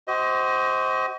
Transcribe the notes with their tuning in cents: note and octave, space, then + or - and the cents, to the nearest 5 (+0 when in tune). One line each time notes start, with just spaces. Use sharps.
F#4 +35 C5 +0 D#5 +25